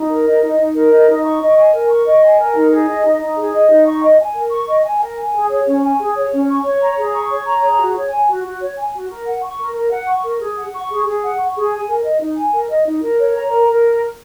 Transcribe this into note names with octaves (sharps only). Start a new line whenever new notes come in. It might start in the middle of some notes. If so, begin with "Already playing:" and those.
Already playing: D#4
A#4
D#5
D#4
D#4
A#4
D#5
D#4
C#6
D#5
G#5
A#4
C#6
D#5
G#5
A#4
D#4
G#4
D#5
D#4
D#4
G#4
D#5
D#4
C#6
D#5
G#5
A#4
C#6
D#5
G#5
A#4
G#5
G#4
C#5
C#4
G#5
G#4
C#5
C#4
C#6
C#5
A#5
G#4
C#6
C#5
A#5
G#4
F#4
C#5
G#5
F#4
F#4
C#5
G#5
F#4
A#4
F#5
C#6
A#4
A#4
F#5
C#6
A#4
G#4
F#5
C#6
G#4
G#4
F#5
C#6
G#4
G#5
A#4
D#5
D#4
G#5
A#4
D#5
D#4
A#4
C#5
A#5
A#4
A#4